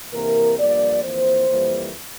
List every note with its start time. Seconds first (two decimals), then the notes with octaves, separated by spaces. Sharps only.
0.13 C3 E3 A#3 A#4
0.58 G2 F3 A#3 D5
1.03 F2 E3 A#3 C5
1.48 F2 E3 G3 A#3